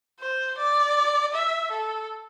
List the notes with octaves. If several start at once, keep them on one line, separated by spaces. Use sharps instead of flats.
C5
D5
E5
A4